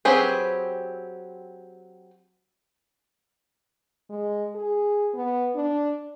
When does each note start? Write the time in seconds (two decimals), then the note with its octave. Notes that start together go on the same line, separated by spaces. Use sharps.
0.05 F#3 C4 G4 G#4 B4
4.10 G#3
4.55 G#4
5.14 B3
5.56 D4